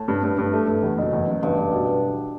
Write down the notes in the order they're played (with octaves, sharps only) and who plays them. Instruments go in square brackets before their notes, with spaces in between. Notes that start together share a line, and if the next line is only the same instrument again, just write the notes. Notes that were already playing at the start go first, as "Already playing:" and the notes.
Already playing: [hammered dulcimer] A2
[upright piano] G2
G2
G2
A3
G2
E2
F#1
E2
F#1
[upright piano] E2 [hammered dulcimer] G2
[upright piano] F#1
B2